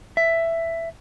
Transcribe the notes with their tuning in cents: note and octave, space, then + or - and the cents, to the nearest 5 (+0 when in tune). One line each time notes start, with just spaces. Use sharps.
E5 +10